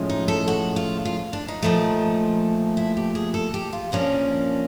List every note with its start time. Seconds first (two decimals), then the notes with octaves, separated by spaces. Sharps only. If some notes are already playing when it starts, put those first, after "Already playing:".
Already playing: A2 F3 G#3 C#4
0.10 D#4
0.28 A4
0.48 F#4
0.76 F4
1.05 F4
1.33 D4
1.48 D#4
1.62 A#2 F3 A3
2.77 E4
2.97 G4
3.15 G#4
3.34 A4
3.54 G4
3.73 F4
3.92 A#2 F3 A#3 C#4 D4